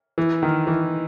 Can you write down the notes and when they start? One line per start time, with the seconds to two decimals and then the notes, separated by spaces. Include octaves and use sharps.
0.18 E3
0.43 D#3
0.67 E3